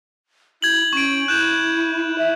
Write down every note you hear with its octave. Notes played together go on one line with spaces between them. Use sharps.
E4 G6 G#6 F#7
C#4 C#6 D7
E4 F#6 G6 E7
E5